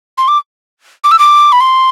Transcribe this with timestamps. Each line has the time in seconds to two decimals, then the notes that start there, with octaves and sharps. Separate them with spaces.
0.18 C6
0.28 D6
1.04 D6
1.11 E6
1.19 D6
1.52 B5
1.60 C6